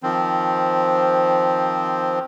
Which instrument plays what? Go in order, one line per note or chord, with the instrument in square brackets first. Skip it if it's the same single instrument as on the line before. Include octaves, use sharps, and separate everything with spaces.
[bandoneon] D#3 F3 C4